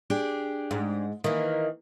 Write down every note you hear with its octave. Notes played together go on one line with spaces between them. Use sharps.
D4 G4 G#4
G#2
D#3 E3 A#3